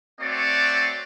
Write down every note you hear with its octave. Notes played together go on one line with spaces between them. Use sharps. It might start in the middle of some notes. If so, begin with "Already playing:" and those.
A3 C4 F#4 C#5 D5